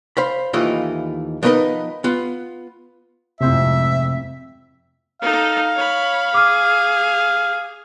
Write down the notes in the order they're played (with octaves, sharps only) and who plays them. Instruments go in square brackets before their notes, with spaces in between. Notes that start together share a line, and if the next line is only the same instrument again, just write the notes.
[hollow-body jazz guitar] C5 F5 B5
D#2 E3 A3 E4 F4 D#5
F3 B3 D#4 A#4 B4 D#5
B3 F4
[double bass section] F2 G#2 [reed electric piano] C3 [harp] A3 C4 E4 [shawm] E5
[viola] D#4 A4 [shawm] F5
[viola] C#5 B5
[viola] G#4 [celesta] D6 F6